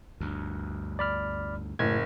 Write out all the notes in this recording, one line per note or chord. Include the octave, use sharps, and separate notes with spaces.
D2 G2
D5 B5 F6
F#1 A2 C#3 G#6